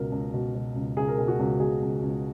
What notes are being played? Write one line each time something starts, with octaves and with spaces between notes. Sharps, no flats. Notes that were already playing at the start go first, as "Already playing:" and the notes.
Already playing: C#2 B2 A#4
C#2
B2
B2
C#2
C#2 G#4
A#4
B2 G#4
F#4
C#2
B2 G#4
C#2
C#2